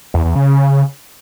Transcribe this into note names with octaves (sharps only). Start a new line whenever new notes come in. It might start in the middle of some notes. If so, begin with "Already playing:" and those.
E2
E2
C#3